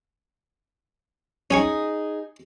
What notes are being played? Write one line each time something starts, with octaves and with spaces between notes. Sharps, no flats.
C#4 D#4 G#4 G#5 C#6